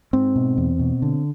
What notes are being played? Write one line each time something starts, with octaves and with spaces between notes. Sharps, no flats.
G#2 C4
B2
E2
B2
D3